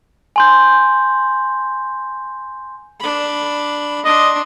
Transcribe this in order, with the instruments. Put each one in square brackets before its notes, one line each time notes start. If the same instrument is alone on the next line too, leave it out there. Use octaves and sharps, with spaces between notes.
[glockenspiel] G#5 C6 G6
[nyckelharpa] D4 B5
[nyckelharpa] D4 C6 [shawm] D#5